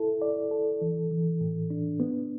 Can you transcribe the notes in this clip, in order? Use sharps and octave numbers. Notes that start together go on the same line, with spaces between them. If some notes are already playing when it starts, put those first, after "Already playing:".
Already playing: E4 A4
D5
A4
E3
E3
A2
D4
B3